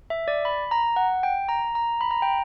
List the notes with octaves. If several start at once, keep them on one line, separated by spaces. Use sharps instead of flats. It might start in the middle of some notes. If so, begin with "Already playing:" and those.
E5
D5
B5
A#5
F#5
G5
A#5
A#5
B5
A#5
G5